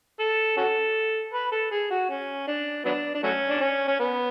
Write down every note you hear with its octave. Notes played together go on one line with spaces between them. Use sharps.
A4
C#4 F#4 A4
B4
A4
G#4
F#4
C#4
D4
F#3 B3 D4
D4
F#3 A3 C#4
D4
C#4
C#4
B3